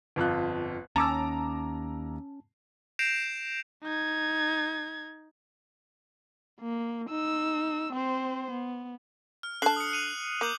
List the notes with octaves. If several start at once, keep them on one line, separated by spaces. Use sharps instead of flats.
G1 F2 F4 F#6
D#2 C#4 A5 A#5 D6 E6
G6 A#6 C7 D7 E7 F7
D#4 G#6
A#3
D#4 E6
C4 C5
B3
F6
D3 A5 F#6 C7 F#7
D#6 C#7
C#7 D#7 F7
A#3 D6 G6 F#7